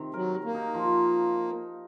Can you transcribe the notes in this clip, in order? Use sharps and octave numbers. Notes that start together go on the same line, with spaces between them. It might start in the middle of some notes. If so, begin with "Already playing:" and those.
Already playing: C3 D#3
F#3 A#4
A#4
A#3
D#4
F3